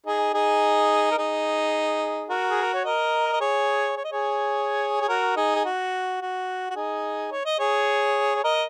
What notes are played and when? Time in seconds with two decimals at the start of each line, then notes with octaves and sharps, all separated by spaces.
0.06 D#4 G#4
0.34 D#4 G#4
1.12 A#4
1.18 D#4 G#4
2.30 F#4 A#4
2.51 G#4
2.62 A#4
2.74 C#5
2.85 A#4 D#5
3.33 D#5
3.41 G#4 C#5
3.97 C#5
4.04 D#5
4.12 G#4 C#5
5.01 G#4
5.08 F#4 A#4
5.36 D#4 G#4
5.55 G#4
5.65 F#4
6.21 F#4
6.70 F#4
6.76 D#4 G#4
7.32 C#5
7.46 D#5
7.59 G#4 C#5
8.36 C#5
8.44 A#4 D#5